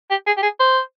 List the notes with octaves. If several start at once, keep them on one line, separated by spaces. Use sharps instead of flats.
G4
G#4
G4
G#4
C5